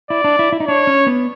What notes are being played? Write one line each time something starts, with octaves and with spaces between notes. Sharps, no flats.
E4 D5
D4
E4
E4
D#4
D4 C#5
C#4
B3